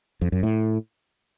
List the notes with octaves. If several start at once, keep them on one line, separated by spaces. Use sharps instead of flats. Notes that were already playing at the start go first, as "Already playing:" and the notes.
F2
F#2
A2